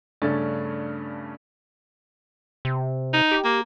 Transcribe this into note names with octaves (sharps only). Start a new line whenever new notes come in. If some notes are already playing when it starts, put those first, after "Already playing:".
G2 C#3 A3 C#4 D4 A6
C3
D#4
G4
A#3